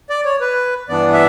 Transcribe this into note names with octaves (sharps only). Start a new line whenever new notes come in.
D5
C#5
B4
G2 E3 B3 D4 D5
E5